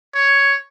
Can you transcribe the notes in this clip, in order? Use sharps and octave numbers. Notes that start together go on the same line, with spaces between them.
C#5